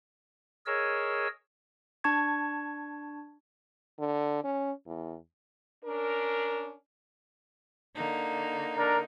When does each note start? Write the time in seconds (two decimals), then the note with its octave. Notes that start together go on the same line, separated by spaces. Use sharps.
0.66 G#4 A#4 C#5 D#5 E6
2.04 D4 A5 C#6 G#6
3.99 D3
4.44 C#4
4.87 E2
5.83 C#4 D4 A#4
7.96 D3 A#3 D#4
8.76 D4 A#4 A#5